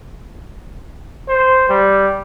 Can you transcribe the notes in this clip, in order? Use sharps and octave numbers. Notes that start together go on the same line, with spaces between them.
C5
G3